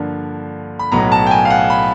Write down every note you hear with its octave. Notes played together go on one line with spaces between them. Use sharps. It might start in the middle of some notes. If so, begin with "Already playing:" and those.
Already playing: G2 D3 F3 A#3
B5
B1 A2 F#3 B3 A#5
A5
G5
G#5
F5
F#5
B5